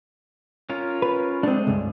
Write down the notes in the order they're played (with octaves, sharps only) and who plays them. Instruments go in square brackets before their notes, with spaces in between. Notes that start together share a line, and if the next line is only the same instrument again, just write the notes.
[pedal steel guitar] C#4 F4 A#4
[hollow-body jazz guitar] B4
[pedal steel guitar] G#3 A3 [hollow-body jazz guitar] C4 D4
[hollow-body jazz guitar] C#2 G2